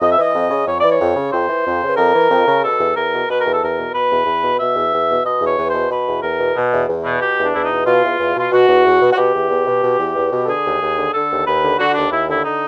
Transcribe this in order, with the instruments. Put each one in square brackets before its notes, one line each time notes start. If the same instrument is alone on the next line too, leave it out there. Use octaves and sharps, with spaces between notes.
[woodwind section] F2 D#5
E5
E3 D#5
F2
C#3
F2 C#5
E3 D5
C#5
F2
C#3
F2 C5
E3
F2
C#3
B4
F2 A#4
E3
F2
C#3
B2 A4
E2
E2 A#4
B2
B2 B4
E2 A#4
A4
E2 A#4
B2
B2 B4
E2
E2
B2
B2 E5
E2
E2
B2
B2 D#5
E2
C#5
E2 B4
B2 C5
B2 B4
E2
E2 A#4
B2
B2
E2
E2
B2
B2 G4
E2
D4
E2 E4
D#4
B2
B2 F4
E2
E2
B2 F4
B2 F#4
E2
E2
B2
F#4
B2 G4
E2
E2
B2
B2
E2
E2
B2
A4
D3 G#4
D#2
D#2
D3
D3 A4
D#2
D#2 B4
D3
D3 F#4
D#2 D4
D#2 E4
D3 E4
D3 D#4